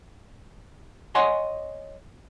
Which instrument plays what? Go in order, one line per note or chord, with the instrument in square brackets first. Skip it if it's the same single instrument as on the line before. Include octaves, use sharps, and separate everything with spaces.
[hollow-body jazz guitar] C#5 D#5 F#5 G#5 C6